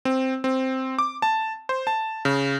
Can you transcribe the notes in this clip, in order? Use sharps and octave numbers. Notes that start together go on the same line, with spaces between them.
C4
C4
D6
A5
C5
A5
C#3